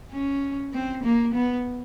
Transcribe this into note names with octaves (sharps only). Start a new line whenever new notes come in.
C#4
C4
A#3
B3